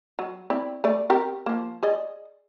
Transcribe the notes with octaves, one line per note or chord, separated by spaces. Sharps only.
F#3
C4 E4 D5
A3 D5
C4 G4 A#4
F3 A#3
G#4 D5 D#5